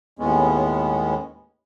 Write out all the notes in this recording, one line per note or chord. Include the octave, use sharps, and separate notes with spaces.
D#2 A2 G#3 B3 C#4